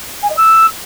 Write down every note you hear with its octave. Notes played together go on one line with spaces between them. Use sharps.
G#5
D#5
E6